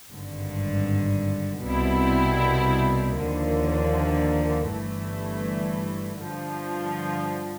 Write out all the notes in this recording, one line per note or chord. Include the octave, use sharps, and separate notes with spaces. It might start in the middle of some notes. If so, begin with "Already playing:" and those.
G#1 G2 D3
C2 B2 G3 C4 E4
D#2 D3 F3 A#3
G1 G2 E3 A3
G2 D3 F3